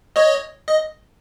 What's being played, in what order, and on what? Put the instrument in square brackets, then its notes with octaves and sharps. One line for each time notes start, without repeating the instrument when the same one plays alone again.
[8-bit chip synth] C#5 D#5
D#5